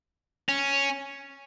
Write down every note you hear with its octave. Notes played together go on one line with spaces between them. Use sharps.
C#4